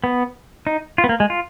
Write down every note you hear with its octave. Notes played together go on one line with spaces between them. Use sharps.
B3
D#4
F4
B3
A#3
G#3
F4